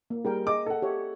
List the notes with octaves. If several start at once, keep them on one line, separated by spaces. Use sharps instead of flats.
A#3
G3 G#4 A#4 G5
G#4 D#5 D6
A4 F#5
G4 C#5 E5